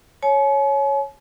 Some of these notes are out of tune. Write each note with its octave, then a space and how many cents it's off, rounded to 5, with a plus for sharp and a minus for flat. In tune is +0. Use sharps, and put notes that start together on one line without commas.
C#5 +0 G#5 +45